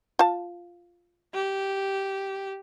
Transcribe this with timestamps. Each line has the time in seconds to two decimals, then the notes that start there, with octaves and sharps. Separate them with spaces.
0.19 F4 A5
1.34 G4